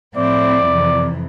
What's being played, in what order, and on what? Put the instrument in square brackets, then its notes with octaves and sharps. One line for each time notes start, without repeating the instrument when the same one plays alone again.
[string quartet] A2 F3 C4 E4 [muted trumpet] D5
[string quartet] F2 C3 E3